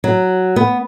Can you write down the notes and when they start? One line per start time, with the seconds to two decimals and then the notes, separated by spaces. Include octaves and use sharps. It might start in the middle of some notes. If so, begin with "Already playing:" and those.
0.04 F#3
0.56 B3